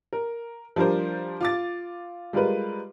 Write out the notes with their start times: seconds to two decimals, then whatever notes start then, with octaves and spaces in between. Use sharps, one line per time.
0.13 A#4
0.76 F3 G3 D4 A#4 C5
1.41 F4 D6 A6
2.33 G3 G#3 F4 A#4 B4